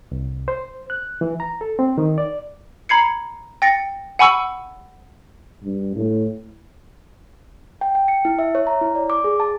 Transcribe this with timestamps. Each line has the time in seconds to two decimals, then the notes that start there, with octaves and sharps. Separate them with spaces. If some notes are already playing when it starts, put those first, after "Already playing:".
0.12 C2
0.48 C5
0.90 F#6
1.21 E3
1.40 A#5
1.61 A4
1.79 C4
1.98 D#3
2.18 D5
2.89 A#5 B5 G#6 C7 C#7
3.62 G5 A6 A#6 C#7
4.19 F#5 G#5 B5 C#6 E6
5.64 G2
5.96 A2
7.81 G5
7.95 G5
8.08 C#7
8.25 E4
8.39 E5
8.55 C#5
8.67 A#5
8.81 E4
8.95 D5
9.10 D6
9.24 G#4
9.40 A5